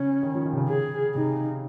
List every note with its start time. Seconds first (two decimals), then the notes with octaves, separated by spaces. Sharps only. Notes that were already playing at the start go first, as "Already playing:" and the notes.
Already playing: C#3 C#4
0.23 D#3
0.35 F3
0.45 D#3
0.52 C3
0.57 C#3
0.69 G#4
1.15 C3 D#4